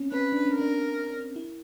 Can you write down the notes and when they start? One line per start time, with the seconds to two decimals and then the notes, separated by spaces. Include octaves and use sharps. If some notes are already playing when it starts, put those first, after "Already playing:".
Already playing: C4 C#4
0.12 C#4 B4
0.32 D4
0.46 C#4
0.53 A#4
0.59 D4
1.36 E4